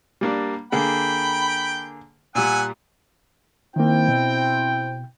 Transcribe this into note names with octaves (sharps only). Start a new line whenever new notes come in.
G3 A#3 D4
D3 A#3 G#4 G5 B5
A#2 G3 F#5 G#5 E6
D#3 A#3 C4 E4 G5
B2